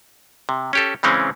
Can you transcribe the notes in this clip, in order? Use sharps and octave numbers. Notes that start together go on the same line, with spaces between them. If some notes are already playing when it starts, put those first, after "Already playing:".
C3
C#4 G4 A4
C#3 E3 G#3 C4 C#4